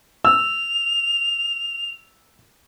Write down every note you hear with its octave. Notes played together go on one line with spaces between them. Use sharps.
E6 F7